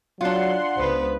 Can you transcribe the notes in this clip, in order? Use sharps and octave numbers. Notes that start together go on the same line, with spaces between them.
F#3 D4 F4 F#5 C6
C#2 B3 B4 C5